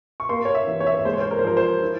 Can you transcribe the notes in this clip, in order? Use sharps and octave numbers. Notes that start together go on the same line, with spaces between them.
C#6
A#3 C6
C#5
E5
E3
C#5
E5
C#5
G#3 C5
C#5
C5
A#4
C5
F3 A#4
C5
E4